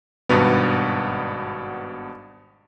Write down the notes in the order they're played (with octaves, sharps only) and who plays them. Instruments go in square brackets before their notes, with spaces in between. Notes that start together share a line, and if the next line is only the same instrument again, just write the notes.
[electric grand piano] G#1 G2 B2 B3